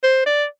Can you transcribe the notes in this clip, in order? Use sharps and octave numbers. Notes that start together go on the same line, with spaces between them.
C5
D5